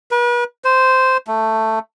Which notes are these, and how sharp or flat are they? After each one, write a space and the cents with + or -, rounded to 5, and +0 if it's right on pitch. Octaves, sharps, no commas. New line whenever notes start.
B4 -40
C5 -10
A3 +5